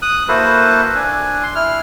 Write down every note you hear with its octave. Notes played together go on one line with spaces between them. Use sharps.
D#6 F#6
A#3 E4 F#4 A4 B4 C5
D4 G#5
C6
E4 F6